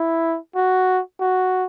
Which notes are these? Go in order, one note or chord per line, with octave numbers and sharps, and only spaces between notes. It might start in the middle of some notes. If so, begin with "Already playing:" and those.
Already playing: E4
F#4
F#4